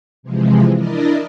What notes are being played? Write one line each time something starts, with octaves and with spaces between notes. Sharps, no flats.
C3 E3 F3 G#3
D4 E4 A#4 D5 D#5